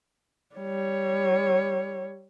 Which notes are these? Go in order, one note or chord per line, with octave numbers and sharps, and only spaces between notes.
G3 C#5